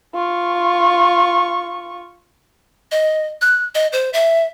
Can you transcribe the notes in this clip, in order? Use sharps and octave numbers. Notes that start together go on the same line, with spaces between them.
F4 C#6
D#5
F#6
D#5
C5
E5